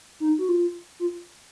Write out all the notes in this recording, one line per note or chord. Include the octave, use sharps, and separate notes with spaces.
D#4
F#4
F4
F4